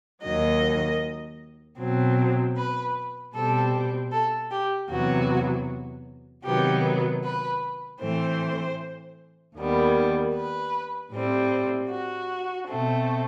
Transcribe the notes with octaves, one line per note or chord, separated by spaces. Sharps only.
D#2 D#3 F#3 D#5
B2 F#3 C4
B4
B2 G3 C4 A4
A4
G4
E2 C3 F#3 B3 F#4
C3 D#3 F#3 B3 G4
B4
A2 E3 A3 C4 C5
D#2 D#3 G3 B3
B4
A2 G3 C4
F#4
B2 A3 C4